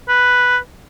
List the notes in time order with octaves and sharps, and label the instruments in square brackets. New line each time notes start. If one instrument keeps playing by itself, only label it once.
[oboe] B4